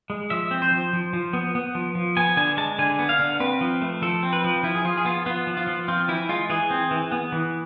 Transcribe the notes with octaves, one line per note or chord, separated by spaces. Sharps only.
G#3
F3 E5
C4
C5
F3
F3
F3
B3
B3
F3
F3
B3 G#5
D3 G#5
G#3 A5
D3 G#5
B3
F5
D3
C4 B4
F3
A3
F3 A4
C4
B4
F3
F3 E4
G#4
F3 F4
G#4
B3 F4
B3 F4
F3
F4
F3
C4 F4
E3 E4
G#3 F4
E3 G#4
C4
E3
B3
E3